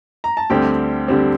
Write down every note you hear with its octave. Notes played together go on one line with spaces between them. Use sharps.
A#5
A5
D2 D3 G3 C4 G4 G5
D3 G3 C4